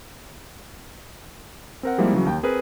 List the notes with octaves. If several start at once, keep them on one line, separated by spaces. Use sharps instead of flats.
C4 A#4 F#5
F3 G3 G#3 A#3 C4 E4
C#3 E3 F#3
D#2 G5
C4 G#4 A#4 B4